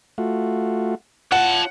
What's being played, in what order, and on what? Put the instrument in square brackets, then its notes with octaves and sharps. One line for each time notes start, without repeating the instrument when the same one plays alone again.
[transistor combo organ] A3 F4 F#4
[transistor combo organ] F4 [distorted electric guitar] C#5 A5 [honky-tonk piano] F#5